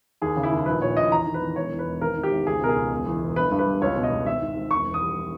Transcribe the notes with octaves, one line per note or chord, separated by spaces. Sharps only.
D#2 G#4
C#3
E4
D#2
A#1 B4
A#2 C#5
A#1 D#5
E2 A#5
D#3
B4
E2
E1 C#5
E2
B4
E1
G#1 A#4
G#2
G4
G#1
C#2 G#4
B2 A#4
G#4
C#2
E1
E2
E1
G1 B4
G2
B4
G3
C#2 C#5
B2
D#5
C#2
G#1 E5
G#2
G#1
E1 C#6
E2
D#6
G3